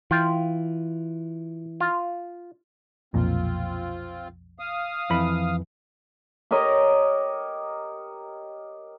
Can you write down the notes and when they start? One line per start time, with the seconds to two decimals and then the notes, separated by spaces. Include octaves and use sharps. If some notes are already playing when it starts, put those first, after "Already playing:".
0.11 E3 F4 G5
1.81 F4
3.14 B1 F2 A#2 C4 F4
4.59 F5 D#6
5.10 F2 E3 B5
6.51 G4 A#4 C#5 D#5